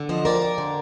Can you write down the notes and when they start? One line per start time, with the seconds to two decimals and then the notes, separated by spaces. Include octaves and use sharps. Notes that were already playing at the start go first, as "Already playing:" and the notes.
Already playing: D3
0.09 F3 C5 D#5
0.25 F2 A#4 D5
0.42 F2
0.58 D3